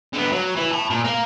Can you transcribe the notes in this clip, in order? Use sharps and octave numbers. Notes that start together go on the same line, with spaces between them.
D3 B3
F#3
E3
A5 B5
A#2
A#4 F5